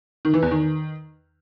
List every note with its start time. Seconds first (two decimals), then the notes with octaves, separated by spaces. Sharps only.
0.25 D#3
0.34 E3
0.42 E2
0.51 D#3